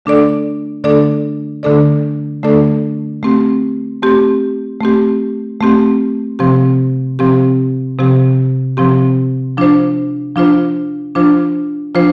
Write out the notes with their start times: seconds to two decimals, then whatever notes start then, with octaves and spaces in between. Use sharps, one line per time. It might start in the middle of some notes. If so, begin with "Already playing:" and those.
0.05 D3 A3 D4 A4 D5
0.84 D3 A3 D4 A4 D5
1.63 D3 A3 D4 A4 D5
2.43 D3 A3 D4 A4 D5
3.23 A3 C4 G4
4.02 A3 C4 G4
4.80 A3 C4 G4
5.60 A3 C4 G4
6.39 C3 F3 C4 G4
7.19 C3 F3 C4 G4
7.99 C3 F3 C4 G4
8.77 C3 F3 C4 G4
9.58 F3 D4 F4 C5
10.36 F3 D4 F4 C5
11.15 F3 D4 F4 C5
11.95 F3 D4 F4 C5